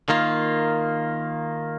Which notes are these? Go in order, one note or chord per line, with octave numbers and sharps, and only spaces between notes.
D#3 A#3 F4